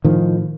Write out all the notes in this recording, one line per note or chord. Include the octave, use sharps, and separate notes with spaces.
A2 D#3 F3